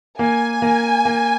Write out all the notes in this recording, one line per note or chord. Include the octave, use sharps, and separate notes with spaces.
A#3 G#5
A#3
A#3